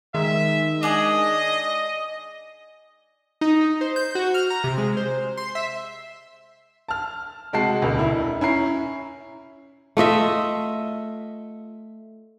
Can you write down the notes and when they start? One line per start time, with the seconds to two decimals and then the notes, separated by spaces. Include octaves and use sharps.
0.14 D#3 G#3 E5
0.83 D4 G#4 D5 D#5
3.41 D#4
3.61 D#4
3.81 C5
3.96 G6
4.15 F#4
4.34 F6
4.50 A#5
4.64 C3
4.78 G#3
4.97 C5
5.37 C6
5.55 E5
6.88 A5 F6
7.53 C3 G#3 F#4 A5 C7
7.82 D#1 C#2
7.96 E1 E4
8.41 C#4 E4 A#5 C7
9.97 A3 F4 D#5 E5